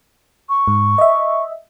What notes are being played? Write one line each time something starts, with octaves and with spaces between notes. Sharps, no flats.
C#6
G#2
D#5 E5